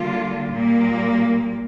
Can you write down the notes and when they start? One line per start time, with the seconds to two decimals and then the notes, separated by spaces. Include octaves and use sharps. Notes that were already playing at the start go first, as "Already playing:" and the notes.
Already playing: D3 G3 A#3 F4
0.53 A#2 G3 A#3